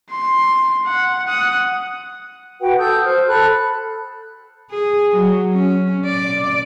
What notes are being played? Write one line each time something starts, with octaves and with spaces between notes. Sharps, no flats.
C6
F#5
F#5 D#6
F#4 B4 F#5 G5
A4 D#6 E6 G6
C5 F6
A4 B5 F#6
G#4
F#3
C#4
D5